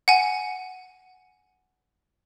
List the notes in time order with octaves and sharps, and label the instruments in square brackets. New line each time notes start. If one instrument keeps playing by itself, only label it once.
[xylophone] F#5 G#5